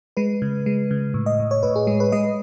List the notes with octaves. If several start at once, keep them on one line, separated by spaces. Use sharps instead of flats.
G#3 B4
C#3
G#3
C#3
A2
D#5
A2
C#5
A2 B4
G#4
G#3 G#4
B4
G#3 D#5